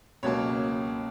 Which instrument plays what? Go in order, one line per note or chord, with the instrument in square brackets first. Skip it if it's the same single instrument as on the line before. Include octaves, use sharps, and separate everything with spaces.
[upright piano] C#2 B2 F#3 A#3 C#5